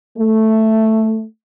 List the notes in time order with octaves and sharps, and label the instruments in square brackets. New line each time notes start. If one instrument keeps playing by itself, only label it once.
[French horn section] A3